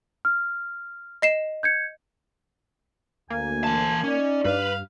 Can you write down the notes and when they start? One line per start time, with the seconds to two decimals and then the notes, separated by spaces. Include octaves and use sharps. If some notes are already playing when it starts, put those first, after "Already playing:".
0.25 F6
1.22 D#5 C7 E7
1.63 G6 G#6 C#7
3.30 D2 A#3 G#5
3.64 E3 A5
4.04 C#4 D#4 D5
4.45 G2 B4 F5